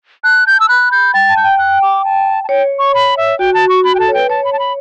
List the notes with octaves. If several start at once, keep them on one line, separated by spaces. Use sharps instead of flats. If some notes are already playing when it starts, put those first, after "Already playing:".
A5 F#6
G6
E6
B5 F#6
G6
G5 A6
A5
G6
G5
F#6
D6
A5
A5
C#5 G5
C#6
B5
E5
F#4 G5
A5
C#6
F#4 B5
G5
A4 A5
C#5
B4 G5
C#5 A5
B5
A5
B5